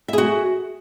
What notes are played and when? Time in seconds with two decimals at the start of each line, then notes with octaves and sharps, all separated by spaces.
0.08 E5
0.13 G#4
0.18 F#4